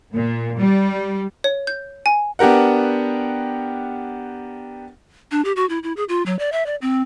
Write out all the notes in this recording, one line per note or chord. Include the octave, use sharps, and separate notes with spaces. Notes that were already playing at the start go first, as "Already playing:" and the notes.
A#2
G3
C#5
G6
G#5
B3 D4 G4 A#4 F#5
D4
G4
F#4
E4
E4
G#4
F4
F#3
D5
E5
D5
C4